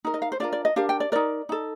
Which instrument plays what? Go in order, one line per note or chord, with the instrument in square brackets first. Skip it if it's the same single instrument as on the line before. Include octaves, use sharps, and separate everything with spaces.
[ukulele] D#4 A#4
D#5
F5
C5
D4 F4 A#4 D5
D5
D#5
D4 G4 A#4 F5
G5
D5
D#4 A#4 D5
D#4 A4